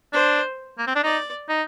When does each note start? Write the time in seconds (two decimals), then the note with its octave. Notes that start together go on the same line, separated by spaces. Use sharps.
0.13 D4 C5
0.78 A#3
0.87 C4
0.95 D4
1.04 D#4 D5
1.49 D#4